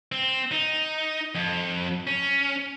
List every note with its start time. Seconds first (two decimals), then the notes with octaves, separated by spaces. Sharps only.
0.12 C4
0.52 D#4
1.35 F2
2.07 C#4